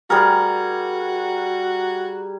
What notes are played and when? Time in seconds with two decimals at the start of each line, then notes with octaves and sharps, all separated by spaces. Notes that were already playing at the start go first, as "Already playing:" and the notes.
0.10 G3 F#4 G#4 A#4